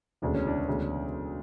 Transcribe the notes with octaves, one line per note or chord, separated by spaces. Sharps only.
E1 D2 C#3 D4
C#4
D4
E1 D2 C#3